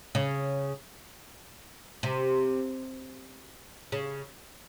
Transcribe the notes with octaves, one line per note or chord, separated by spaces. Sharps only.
C#3
C3
C#3